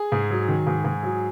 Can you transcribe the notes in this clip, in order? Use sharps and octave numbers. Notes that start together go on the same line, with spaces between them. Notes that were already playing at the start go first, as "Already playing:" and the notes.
Already playing: G#4
G#2
F#3
D#3
G#2
G#2
F#3